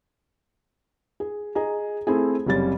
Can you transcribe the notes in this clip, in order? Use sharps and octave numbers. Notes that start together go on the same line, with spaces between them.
G#4
G#4 D#5 A#5
A3 C4 E4 G#4
F#1 C3 G3 C#4 A6